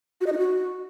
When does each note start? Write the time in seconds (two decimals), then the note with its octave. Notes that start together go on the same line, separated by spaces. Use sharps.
0.21 F#4
0.27 D#5
0.32 D#4
0.38 F#4